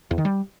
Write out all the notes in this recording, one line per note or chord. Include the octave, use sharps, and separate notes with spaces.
E2
D#3
G3